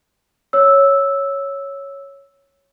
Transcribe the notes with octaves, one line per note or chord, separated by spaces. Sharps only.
C#5 E6